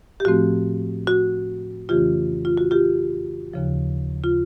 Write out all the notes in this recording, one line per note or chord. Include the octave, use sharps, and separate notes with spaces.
G4
A2 F3 A3 C4 F#4
F#4
F2 C#3 E3 A3 C#4 F4 G4
F4
F#4
F4 G4
D#2 C#3 F3
F4